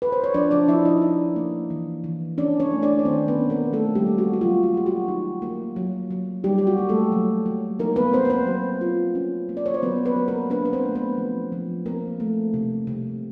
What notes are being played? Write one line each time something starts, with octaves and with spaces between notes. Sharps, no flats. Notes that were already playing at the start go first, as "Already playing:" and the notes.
B4
C5
C#5
F3 D4 D5
D4 D5
F3 E4 E5
D#4 D#5
D#4
A#3
E3
E3
C#4 D4 D5
C#4 C#5
A3
D4 D5
C#5
D#3 C4 C5
B3 B4
C#4
A#3 A#4
A3 A#3 A4
G3 G4
G3
F#4
F#4
F#3 F4
F#4
F#3 G4
F#4
D#4
A#3
F#3
F#3
G3 D#4 G4
G4
F#4
A#3
A3 A4
F#3
F#3
A#3 D#4 A#4
B3 B4
A#3 C4 C5
B4
C4 C5
F#3
F4
C#4
A#3
D5
C#5
C5
F#3 B3 B4
B3 B4
F#3
A#3 A#4
B3 D4 B4
B4
C4 C5
A3
B3 B4
F3
F3
A#3 C4 A#4
A3
C3
C3